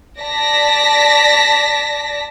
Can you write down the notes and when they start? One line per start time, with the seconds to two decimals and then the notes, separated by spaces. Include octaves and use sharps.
0.19 D5 A5 A#6 B6